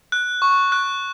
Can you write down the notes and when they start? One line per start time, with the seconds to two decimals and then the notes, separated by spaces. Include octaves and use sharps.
0.12 F#6
0.42 C#6
0.72 F#6